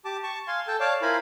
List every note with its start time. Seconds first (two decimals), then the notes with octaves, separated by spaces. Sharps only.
0.05 G4 A5 D6
0.23 A5 C#6
0.48 F5 G#5 C6
0.67 A4 G5 A5
0.80 C#5 D5 F5 A5 D6
1.02 E4 F4 A#4 C5 G#5 B5